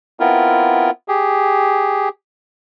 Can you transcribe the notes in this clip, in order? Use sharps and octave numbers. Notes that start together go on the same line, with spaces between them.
B3 C4 E4 F4 A#4
G4 G#4